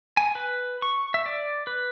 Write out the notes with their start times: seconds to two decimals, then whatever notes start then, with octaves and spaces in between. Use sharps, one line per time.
0.17 G#5
0.35 B4
0.82 C#6
1.14 E5
1.26 D5
1.67 B4